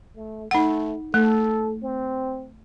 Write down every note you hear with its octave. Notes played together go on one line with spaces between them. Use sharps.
A3
A3 D#4 F#5
A3 A4
C4